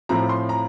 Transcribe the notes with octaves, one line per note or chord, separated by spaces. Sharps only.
A2 F3 C4 A#5
C6
A#5